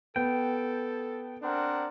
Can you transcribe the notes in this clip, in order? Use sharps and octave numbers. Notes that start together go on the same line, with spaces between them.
B3 A4 G5
C4 D4 A#4 F#5